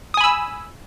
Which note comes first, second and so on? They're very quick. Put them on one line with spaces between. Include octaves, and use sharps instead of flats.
D#6 G#5 B5 E6